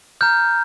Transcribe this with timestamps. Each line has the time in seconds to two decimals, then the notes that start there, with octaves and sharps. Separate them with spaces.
0.21 A#5 F6 G6